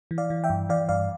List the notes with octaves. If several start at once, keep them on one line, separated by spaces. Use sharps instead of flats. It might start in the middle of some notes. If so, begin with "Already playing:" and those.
E3
D5 F5
E3
E5 G5
G2
E3 D5 F5
G2 D5 F5